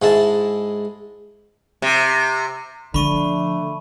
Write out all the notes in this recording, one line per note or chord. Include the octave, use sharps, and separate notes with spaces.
G#2 G#3 E4 A5
C3
D3 F3 A3 D4 B5 C#6 D#7